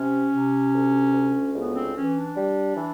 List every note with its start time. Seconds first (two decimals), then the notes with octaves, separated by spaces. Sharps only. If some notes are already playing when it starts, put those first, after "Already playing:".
Already playing: C3 C#4
0.32 C3
0.73 D2
1.13 D2
1.54 C#2 B3
1.75 C4
1.95 E3 C#4
2.16 D4
2.37 G3
2.77 E3